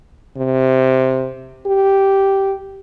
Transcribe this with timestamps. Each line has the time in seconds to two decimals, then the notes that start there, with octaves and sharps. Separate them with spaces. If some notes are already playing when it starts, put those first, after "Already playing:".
0.37 C3
1.66 G4